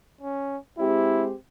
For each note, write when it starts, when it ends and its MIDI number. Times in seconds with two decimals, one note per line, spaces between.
0.21 0.58 61
0.78 1.33 56
0.78 1.33 60
0.78 1.25 64
0.78 1.33 67